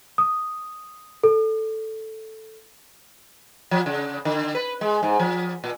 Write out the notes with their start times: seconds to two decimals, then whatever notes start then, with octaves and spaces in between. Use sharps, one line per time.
0.18 D#6
1.24 A4
3.71 F3
3.86 C#3
4.25 D3
4.55 B4
4.81 G#3
5.03 G#2
5.19 F3
5.64 A#2